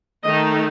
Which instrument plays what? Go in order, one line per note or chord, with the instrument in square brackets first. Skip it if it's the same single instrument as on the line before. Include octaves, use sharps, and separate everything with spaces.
[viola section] D#3 A3 D#4 D#5